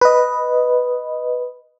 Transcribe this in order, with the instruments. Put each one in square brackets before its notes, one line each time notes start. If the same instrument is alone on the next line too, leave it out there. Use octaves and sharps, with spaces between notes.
[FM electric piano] B4 D#5